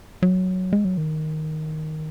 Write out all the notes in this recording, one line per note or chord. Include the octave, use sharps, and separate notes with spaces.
F#3
G#3
F#3
D#3